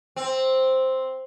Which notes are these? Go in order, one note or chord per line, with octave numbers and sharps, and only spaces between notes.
C4